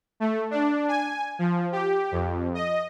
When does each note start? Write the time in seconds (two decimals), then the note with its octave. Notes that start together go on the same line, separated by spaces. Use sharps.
0.20 A3
0.51 D4
0.88 G#5
1.39 F3
1.72 G4
2.12 F2
2.54 D#5